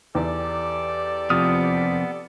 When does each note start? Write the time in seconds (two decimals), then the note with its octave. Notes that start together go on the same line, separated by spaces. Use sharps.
0.15 E2 G4 A4 D5
1.30 F2 C3 F3 B3 D#6 F6